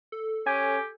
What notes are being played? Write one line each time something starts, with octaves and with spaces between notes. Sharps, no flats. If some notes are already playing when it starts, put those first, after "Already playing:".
A4
C#4 G4 G#5